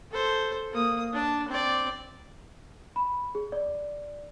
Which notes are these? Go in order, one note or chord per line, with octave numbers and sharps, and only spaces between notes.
A4 C5
A#3 D#6
D4 A5
C4 D5
B5
G#4
D5